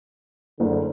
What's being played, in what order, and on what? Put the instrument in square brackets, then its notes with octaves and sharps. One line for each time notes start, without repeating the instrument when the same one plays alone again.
[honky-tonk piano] F#1 [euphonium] D3